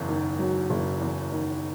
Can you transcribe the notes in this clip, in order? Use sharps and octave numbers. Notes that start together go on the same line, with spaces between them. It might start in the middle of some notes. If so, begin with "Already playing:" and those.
Already playing: F#1 E2
D#3
F#3
F#1
E2
D#3